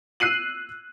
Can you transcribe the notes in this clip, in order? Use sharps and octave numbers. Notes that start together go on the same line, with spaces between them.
E6 F#6 C7 D#7 F#7